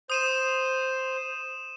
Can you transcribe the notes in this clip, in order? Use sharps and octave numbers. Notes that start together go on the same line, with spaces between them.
C5 D#6 D#7 E7